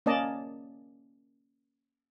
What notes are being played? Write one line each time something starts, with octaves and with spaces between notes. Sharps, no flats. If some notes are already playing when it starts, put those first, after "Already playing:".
A#3 C#4 D5 D#5 A5